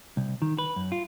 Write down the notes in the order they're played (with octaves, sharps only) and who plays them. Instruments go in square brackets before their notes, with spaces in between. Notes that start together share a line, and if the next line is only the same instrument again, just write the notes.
[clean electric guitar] C2
D#3
B4
F#2
F4